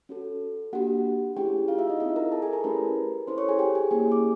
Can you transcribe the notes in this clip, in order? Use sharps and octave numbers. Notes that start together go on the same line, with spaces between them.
C#4 F#4 A4
A#3 D4 F#4 G4 F#5
A3 C#4 E4 G4 G#4 G5
F4 F5
E4 E5
D#4 D#5
C4 E4 F4 G#4 E5
A#4 A#5
A4 A5
G#4 G#5
A#4 A#5
A3 C#4 E4 G4 B4 B5
C#4 E4 A4 C5 C6
C#5 C#6
G#4 G#5
G4 G5
G#4 G#5
A#3 C#4 E4 G4 G#4 G#5
D6